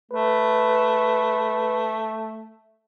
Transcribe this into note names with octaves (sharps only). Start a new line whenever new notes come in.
A3 B4